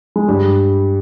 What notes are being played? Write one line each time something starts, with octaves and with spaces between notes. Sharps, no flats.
G#3
G2 G3